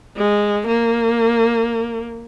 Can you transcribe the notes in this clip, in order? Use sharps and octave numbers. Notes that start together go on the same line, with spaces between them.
G#3
A#3